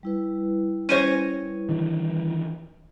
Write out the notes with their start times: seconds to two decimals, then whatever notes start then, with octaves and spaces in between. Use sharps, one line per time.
0.03 G3 E4 B4
0.89 C#4 C5 C#5 A#6 D#7
1.69 D#3 E3 D4